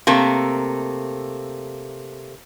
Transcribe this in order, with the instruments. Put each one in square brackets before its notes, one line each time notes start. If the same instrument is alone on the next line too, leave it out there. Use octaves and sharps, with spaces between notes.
[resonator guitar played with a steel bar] C3 A3 A#3